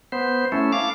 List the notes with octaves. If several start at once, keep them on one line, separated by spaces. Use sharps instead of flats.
B3 C5
A3 C#4 E4
F5 D6